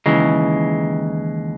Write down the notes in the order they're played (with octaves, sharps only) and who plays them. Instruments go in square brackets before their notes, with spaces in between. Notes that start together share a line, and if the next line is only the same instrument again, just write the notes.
[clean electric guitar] D#2 C#3 E3 G#3